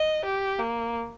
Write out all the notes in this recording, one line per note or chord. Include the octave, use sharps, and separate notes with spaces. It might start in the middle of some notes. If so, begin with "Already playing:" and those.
Already playing: D#5
G4
A#3